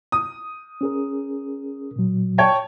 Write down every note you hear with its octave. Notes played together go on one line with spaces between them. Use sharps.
D#6
C#4 G#4 A#4
A#2 F#3
C#5 G5 A5